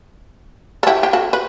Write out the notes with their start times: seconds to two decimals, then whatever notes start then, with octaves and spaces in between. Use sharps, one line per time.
0.83 A4
0.87 E4 G4
1.03 G4
1.13 F#4 A4
1.33 B4